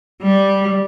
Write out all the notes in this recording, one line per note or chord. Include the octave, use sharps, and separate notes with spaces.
G3